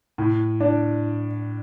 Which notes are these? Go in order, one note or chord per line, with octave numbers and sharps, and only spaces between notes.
A2
D4